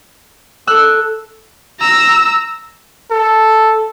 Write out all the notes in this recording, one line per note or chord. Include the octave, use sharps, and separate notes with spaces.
A4 E6 F#6
A#5 E6
A4